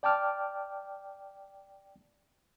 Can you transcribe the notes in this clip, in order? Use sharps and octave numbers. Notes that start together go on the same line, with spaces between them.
D5 G5 A5 D6 F6